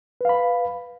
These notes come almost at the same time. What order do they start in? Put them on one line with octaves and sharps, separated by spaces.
B4 F5 B5